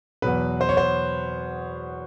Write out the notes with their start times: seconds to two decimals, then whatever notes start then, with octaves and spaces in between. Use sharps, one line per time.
0.22 E2 B2 F#3 B4
0.61 C5
0.69 C#5
0.77 C5